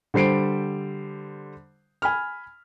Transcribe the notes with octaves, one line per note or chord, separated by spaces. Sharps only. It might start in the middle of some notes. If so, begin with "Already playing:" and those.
D3 G3 C5 C7 D7
G#5 B5 F6